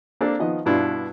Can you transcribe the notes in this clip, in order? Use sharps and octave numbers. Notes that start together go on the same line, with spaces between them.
A#3 C4 D4 A4
D#3 F3 B3 D#5
G2 B2 D4 E4 F4